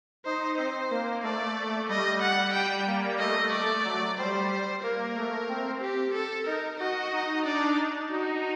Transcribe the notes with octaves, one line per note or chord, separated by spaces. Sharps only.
D#4 C5
C4 C5
A#3
A3 D5
G3 D#5
F#5
G3 G5
A#3
A3 D#5
D5
F#3
G3 C5
A#3 A#4
A3
C4
G4
A4
D#4 A#4
F#4 D#5
D#4
D4 D5
D#4 F#4